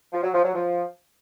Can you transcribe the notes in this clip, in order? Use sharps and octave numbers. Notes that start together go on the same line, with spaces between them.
F3
F#3
F3
F#3
F3